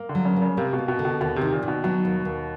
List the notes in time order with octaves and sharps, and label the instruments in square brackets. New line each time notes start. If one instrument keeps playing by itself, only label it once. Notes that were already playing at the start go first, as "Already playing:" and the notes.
Already playing: [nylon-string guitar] A#3
[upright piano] D3
[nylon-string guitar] F#3
[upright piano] C#3
[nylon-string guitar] A#3
[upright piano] C#3
[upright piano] C3 [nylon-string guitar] A#3
[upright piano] B2
[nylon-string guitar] A#3
[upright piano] B2
[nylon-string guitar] D3
[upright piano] B2
[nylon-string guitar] D#2 [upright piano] B2
[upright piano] C3 [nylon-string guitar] D#3
[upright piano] A#2
[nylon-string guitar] D#3
[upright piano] B2
[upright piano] B2 [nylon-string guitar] F#3
[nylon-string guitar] D#2
D#2